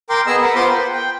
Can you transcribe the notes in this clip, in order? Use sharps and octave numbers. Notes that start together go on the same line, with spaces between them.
A#4 G5 C6 D6
B3 G#4 D#5 E6
A#4 B4 F#5
B3 F4 C5 C6 D6
B4 G5
G5